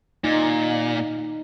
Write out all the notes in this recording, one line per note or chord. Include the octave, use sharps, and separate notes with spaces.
A#2 D#4